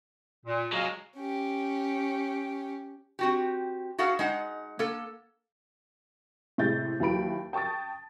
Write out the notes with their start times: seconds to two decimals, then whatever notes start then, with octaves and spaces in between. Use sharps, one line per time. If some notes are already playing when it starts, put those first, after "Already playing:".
0.46 A#2
0.72 F#3 G#3 D#5 F5
1.16 C#4 G4
3.19 C4 F#4 G4
3.99 F#4 G#4 A4 F5 F#5
4.19 G#3 D#4 F#5
4.79 A#3 A4
6.58 A2 C3 G#3 G6 A6
7.00 D#2 E3 F#3 B5 D7
7.53 G5 A5 C#6 D#6 A6